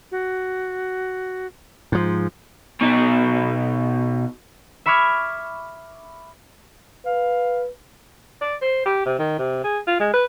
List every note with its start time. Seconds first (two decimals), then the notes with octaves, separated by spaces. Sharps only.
0.12 F#4
1.92 G#2 F3
2.81 B2 D#4
4.86 E5 B5 C#6 D6 F6 G#6
7.06 B4 F5
8.41 D5
8.61 C5
8.86 G4
9.05 C3
9.19 D#3
9.38 C3
9.64 G#4
9.87 F4
10.00 G#3
10.13 B4